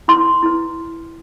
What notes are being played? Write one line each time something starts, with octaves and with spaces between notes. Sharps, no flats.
E4 B4 C6
E4 B4